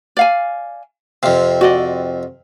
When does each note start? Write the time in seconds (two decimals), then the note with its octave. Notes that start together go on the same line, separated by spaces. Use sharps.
0.17 D5 F5 G#5
1.23 F2 C3 F5
1.61 F#4 D5 D#5